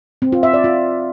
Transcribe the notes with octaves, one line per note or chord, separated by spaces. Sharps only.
C4
F4
E5
D5
F4